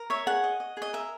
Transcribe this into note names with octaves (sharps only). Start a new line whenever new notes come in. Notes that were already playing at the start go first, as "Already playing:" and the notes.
Already playing: A#4
C#5 E5
G#4 F#5
D#5
D#5
G#4 D#5
A#4 E5